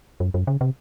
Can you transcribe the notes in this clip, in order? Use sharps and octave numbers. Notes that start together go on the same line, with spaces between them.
F#2
F#2
C#3
C3